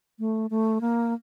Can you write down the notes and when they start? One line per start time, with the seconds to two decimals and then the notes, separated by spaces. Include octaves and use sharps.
0.19 A3
0.50 A3
0.81 A#3